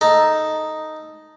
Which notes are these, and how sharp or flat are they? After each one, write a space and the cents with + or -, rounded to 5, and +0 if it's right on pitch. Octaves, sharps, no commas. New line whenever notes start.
D#4 +0 A4 +0